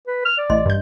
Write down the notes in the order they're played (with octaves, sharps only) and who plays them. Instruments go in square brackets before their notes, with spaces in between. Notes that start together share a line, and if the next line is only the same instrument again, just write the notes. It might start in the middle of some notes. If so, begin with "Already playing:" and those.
[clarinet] B4
F6
D5
[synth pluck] A1 [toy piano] D#5 C6
[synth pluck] G2 G6